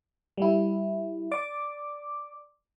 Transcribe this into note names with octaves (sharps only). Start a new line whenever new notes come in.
G3 E4
D5 D6